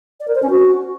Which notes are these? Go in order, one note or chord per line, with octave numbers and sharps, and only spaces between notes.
D5
A#4
C5
C#4
F#4